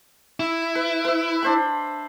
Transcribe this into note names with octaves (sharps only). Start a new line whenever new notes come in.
E4
B4
B4 E5
D4 C5 B5